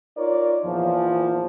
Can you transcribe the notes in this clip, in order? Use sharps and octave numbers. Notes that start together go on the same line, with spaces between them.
D#4 F4 A#4 C#5 D5
E2 A#2 F3